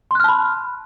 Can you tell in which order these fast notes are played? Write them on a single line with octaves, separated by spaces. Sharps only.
C6 F#6 F6 A5 B5